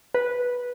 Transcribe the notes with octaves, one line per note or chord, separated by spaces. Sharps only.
B4